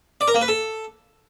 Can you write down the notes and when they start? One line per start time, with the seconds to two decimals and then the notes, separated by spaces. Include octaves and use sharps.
0.21 D5
0.28 A#4
0.34 A#3
0.41 B4
0.48 A4